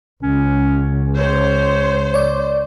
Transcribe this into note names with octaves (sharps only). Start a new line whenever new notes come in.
C#2 C#4
C5 C#5
C#5 D5